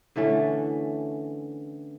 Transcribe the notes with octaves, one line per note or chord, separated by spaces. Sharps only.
D3 E3 A3 C#4